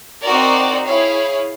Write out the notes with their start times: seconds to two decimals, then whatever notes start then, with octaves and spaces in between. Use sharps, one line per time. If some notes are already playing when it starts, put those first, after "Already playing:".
0.24 C4 D#4 F#4 A#4 D5
0.85 E4 G#4 C#5 F5